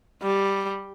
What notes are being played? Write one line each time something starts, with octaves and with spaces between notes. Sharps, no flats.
G3